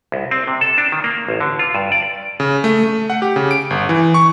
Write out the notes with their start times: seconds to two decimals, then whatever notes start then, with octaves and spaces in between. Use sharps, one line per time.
0.12 C2
0.31 C4
0.47 C3
0.61 A4
0.78 D4
0.92 D#3
1.04 A#3
1.28 A1
1.40 D3
1.59 F4
1.75 G2
1.92 D5
2.40 C#3
2.64 A3
2.83 A3
3.10 F#5
3.22 G4
3.36 C#3
3.51 D7
3.70 G1
3.89 E3
4.14 C#6